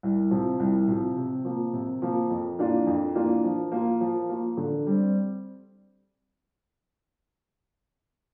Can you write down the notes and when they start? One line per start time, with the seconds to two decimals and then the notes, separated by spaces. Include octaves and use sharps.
0.03 C2
0.31 C3 F3
0.60 C2
0.88 C3 F3
1.17 C3
1.45 F3 A#3
1.73 C3
2.02 F3 A#3
2.30 F2
2.59 E3 A#3 D4 F4
2.87 F2
3.15 E3 A#3 D4 F4
3.44 F3
3.72 A#3 F4
4.01 F3
4.29 A#3 F4
4.57 D3
4.86 G3 C4